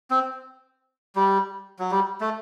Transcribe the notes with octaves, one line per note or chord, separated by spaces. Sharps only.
C4
G3
F#3
G3
A3